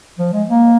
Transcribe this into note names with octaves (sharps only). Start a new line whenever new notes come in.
F3
G#3
A#3